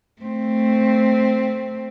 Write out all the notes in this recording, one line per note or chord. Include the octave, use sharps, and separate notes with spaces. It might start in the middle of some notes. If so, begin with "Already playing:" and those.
A3 C4